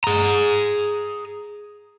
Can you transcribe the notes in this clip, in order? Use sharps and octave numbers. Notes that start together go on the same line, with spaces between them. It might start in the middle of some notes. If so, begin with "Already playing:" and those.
G#4 A#5